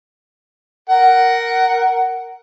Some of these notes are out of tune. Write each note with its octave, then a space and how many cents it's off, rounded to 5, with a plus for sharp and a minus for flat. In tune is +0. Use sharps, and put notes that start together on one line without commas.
A#4 -5 F#5 +15